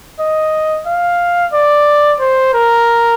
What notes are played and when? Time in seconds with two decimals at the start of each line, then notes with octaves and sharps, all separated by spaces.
0.20 D#5
0.86 F5
1.53 D5
2.20 C5
2.54 A#4